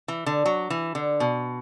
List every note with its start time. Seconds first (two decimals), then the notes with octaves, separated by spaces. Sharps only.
0.08 E3
0.26 D3
0.46 F#3
0.70 E3
0.95 D3
1.20 B2